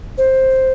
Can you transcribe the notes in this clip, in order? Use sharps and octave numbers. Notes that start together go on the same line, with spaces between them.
C5